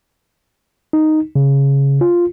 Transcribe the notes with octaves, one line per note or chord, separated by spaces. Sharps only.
D#4
C#3
F4